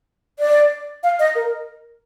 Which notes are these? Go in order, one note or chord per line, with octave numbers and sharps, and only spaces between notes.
D5
F5
D#5
A#4